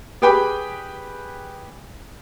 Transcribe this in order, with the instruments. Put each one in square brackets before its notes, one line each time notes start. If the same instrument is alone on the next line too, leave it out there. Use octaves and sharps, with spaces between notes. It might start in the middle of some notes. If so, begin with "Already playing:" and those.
[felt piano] G4 G#4 B4 G5 B5 D6